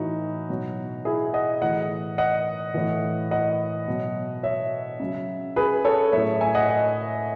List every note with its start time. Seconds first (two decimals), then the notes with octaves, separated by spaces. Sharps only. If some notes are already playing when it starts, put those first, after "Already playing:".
Already playing: A2 E3 D#4 F#4
0.49 B2 F#3
1.05 E4 G#4
1.34 D#5 F#5
1.61 A2 E3 D#5 F#5
2.18 D#5 F#5
2.74 A2 E3
3.31 D#5 F#5
3.88 B2 F#3
4.43 C#5 E5
5.00 C#3 F#3
5.56 G#4 B4
5.85 A4 C#5
6.12 A2 F#3 C#5 E5
6.41 E5 G#5
6.55 D#5 F#5
6.69 D#5 F#5